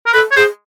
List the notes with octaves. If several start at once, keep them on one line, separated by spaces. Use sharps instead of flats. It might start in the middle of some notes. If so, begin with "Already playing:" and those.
A#4
A4 B4
C#5
G#4 C5